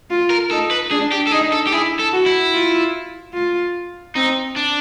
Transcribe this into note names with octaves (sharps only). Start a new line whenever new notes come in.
F4
A#4
D#4 A4
B4
D4 G#4
G4
A4
D#4 G#4
A4
G4
E4 G#4
A4
F#4
E4
F4
F4
C4 D#4
D4